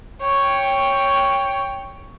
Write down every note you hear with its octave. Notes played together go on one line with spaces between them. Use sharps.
C#5 G5